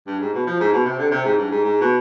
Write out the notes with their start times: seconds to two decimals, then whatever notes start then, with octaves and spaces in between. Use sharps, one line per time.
0.07 G2
0.20 G#2
0.33 B2
0.47 F3
0.60 G#2
0.73 B2
0.85 C3
0.99 D3
1.11 C3
1.24 G#2
1.38 G2
1.51 G#2
1.64 G#2
1.81 B2